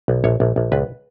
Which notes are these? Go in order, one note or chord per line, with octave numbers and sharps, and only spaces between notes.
B1
A#1 C#5
A#1
A#1
C#2 B4